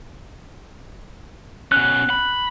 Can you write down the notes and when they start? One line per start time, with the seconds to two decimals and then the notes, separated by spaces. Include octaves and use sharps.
1.72 B2 C#4 F#6
2.10 B5